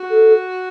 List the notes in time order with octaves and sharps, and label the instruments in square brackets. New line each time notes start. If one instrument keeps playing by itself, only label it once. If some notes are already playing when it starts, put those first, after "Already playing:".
Already playing: [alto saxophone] F#4
[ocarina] A4